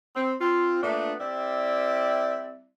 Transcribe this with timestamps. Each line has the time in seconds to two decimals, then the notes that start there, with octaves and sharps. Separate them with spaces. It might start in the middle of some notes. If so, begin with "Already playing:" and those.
0.16 C4
0.41 C4 F4
0.83 A#2 A3 B3 D4
1.20 G3 C4 E4 D5 E5